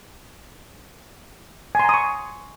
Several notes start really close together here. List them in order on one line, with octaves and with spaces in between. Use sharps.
G#5 C6 A#5 D#6 C#6